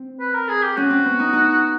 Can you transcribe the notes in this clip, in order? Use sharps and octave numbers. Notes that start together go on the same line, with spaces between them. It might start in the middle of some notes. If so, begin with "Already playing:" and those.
Already playing: C4
B4
A#4
G#4
G4
C#4 F#4
C4
B3
D#4
D#4